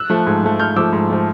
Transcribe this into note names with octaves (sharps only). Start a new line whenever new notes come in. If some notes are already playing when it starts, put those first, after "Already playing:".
Already playing: E6 F#6
F3 A3
G#2
F3 A3
G#2 F6 G6
F3 A3 D6 E6
G#2
F3 A3